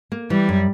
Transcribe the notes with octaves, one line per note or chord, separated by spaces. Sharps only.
A#3
E3 G3
F#2